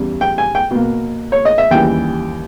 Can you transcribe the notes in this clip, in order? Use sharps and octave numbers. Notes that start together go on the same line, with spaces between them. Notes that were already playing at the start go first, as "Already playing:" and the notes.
Already playing: E2 C#3 G3
G5
G#5
G5
B2 A#3
C#5
D#5
E5
D#2 C#3 E3 G3 G5